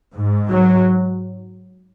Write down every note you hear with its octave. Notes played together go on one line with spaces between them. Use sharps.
G#2
F#3